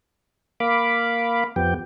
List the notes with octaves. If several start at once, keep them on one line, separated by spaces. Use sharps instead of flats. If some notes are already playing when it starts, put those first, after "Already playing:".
A#3 F5 B5 D6
F2 F3 B3 G4 G5